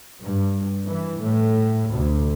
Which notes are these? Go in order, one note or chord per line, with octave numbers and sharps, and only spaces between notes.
G2
E3
A2
D2